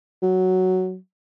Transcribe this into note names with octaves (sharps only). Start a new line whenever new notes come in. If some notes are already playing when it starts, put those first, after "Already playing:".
F#3